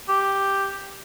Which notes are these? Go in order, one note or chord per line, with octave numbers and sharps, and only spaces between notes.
G4